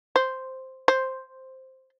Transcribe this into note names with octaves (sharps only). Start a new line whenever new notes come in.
C5
C5